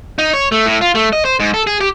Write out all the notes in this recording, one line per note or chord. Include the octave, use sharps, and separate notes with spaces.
D#4
C#5
A3
A2
F4
A3
D#5
C5
G#2
A4
G#4
G4